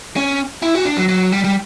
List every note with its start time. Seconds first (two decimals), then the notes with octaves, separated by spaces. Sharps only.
0.16 C#4
0.62 E4
0.75 F#4
0.85 D4
0.97 F#3
1.09 F#3
1.32 G3
1.44 G3